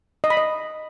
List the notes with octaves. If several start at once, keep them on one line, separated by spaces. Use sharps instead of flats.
D#5
B5
D#5